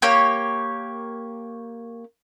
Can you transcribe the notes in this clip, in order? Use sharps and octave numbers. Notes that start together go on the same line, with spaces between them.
A#3 G4 C#5